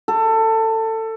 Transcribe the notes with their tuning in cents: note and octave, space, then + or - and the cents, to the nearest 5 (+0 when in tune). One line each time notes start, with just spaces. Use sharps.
A4 +20